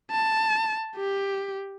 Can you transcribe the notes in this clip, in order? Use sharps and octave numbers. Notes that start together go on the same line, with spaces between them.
A5
G4